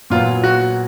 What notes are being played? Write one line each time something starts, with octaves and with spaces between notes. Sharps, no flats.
A#2 F#3 B3 F4
F#4